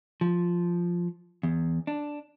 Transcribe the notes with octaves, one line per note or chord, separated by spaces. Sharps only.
F3
E2
D4